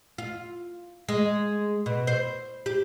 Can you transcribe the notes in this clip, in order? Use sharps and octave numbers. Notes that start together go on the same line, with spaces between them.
F4
G#3
B2
C5
G4